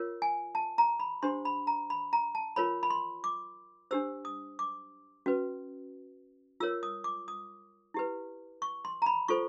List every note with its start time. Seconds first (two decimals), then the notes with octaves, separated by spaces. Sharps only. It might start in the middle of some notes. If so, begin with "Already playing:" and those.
Already playing: F4 A#4 C#5
0.22 G#5
0.55 A5
0.78 A#5
1.00 B5
1.23 D4 G4 C5 C6
1.45 B5
1.67 A#5
1.90 B5
2.13 A#5
2.35 A5
2.56 F4 A#4 C#5 B5
2.83 B5
2.90 C6
3.24 D6
3.91 D4 G4 C5 E6
4.25 D#6
4.59 D6
5.26 C#4 F#4 B4
6.60 F4 A#4 C#5 E6
6.83 D#6
7.04 D6
7.28 D#6
7.94 E4 G4 B4
8.62 C#6
8.85 C6
9.02 A#5
9.06 B5
9.28 F4 A4 C5 C#6